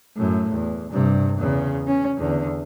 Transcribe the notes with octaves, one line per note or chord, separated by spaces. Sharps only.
F#2 A2
E2
G2 C3
E2 C#3
C#4
E2 D3